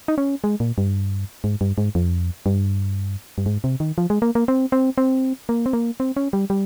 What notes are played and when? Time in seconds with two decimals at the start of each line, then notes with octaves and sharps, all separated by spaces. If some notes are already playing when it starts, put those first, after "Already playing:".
0.08 D#4
0.18 C#4
0.44 G#3
0.60 A#2
0.78 G2
1.44 G#2
1.61 G2
1.78 G#2
1.95 F2
2.46 G2
3.38 G2
3.46 G#2
3.64 C3
3.80 D#3
3.98 F3
4.10 G#3
4.22 A#3
4.35 A#3
4.48 C4
4.72 C4
4.98 C4
5.49 A#3
5.66 C4
5.73 A#3
6.00 C4
6.17 C#4
6.33 G3
6.50 G3